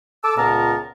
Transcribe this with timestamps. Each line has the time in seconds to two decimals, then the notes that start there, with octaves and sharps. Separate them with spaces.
0.24 A4 A5 D6 E6
0.37 C#2 A#2 B3 A#4 A5 A#5